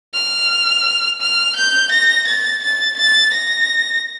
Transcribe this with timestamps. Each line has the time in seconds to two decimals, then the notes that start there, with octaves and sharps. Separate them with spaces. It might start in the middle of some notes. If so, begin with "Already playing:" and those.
0.14 F6
1.21 F6
1.56 G6
1.91 A#6
2.27 A6
2.62 A6
2.97 A6
3.34 A#6